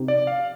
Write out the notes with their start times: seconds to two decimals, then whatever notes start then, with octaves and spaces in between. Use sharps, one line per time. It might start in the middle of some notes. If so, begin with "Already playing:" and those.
Already playing: C3 F3 C4 D#4 G4
0.08 D5
0.27 F5